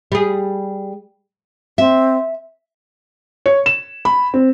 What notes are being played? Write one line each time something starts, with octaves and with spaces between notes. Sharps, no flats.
G3 G#4
C4 E5
C#5
E7
B5
C4